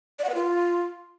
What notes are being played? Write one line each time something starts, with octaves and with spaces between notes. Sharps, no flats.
D5
F#5
B4
F4